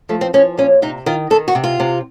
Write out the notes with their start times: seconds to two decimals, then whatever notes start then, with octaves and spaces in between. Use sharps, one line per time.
0.09 F3 A3
0.21 C4
0.34 F3 C#4
0.58 A#2 C#4
0.82 C3 D#4
1.06 D#3 F4
1.30 D#3 A4
1.48 F#4
1.55 C3
1.64 F4
1.80 C3